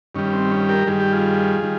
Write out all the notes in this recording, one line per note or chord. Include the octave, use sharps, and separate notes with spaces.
G2 D#3 G3 C#4
C4
C#4
G4 A#4
G2 D#3 G3 G#4
G4
F4 G#4
D#3 G3